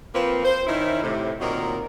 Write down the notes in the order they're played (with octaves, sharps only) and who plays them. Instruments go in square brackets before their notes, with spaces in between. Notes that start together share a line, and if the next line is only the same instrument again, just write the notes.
[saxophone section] F3 A#3 C4 F4 B4 C5
C5
D#3 C#4 D#4 E4
A2 C3
A#2 D#3 F#3 C4 A#4